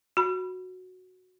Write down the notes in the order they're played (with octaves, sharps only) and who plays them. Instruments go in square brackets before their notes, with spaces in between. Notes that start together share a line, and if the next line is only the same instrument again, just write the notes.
[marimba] F#4 B5